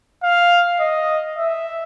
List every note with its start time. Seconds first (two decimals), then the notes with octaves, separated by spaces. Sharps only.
0.24 F5
0.80 D#5
1.37 E5